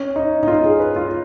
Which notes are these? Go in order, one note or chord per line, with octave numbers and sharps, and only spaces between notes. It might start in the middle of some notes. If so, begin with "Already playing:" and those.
Already playing: C#4
D#4
D#4
F4
G#4
B4
F4